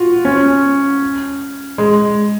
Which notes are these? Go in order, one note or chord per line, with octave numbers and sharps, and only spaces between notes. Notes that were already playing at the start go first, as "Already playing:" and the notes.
Already playing: F4 F#4
C#4
G#3